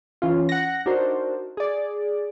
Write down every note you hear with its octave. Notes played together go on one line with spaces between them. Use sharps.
E3 C#4 F4
F#5 A#6
D4 D#4 F#4 A#4 C5
G#4 D5